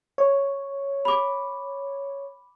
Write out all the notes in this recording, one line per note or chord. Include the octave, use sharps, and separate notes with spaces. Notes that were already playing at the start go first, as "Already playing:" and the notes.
C#5
B5 D6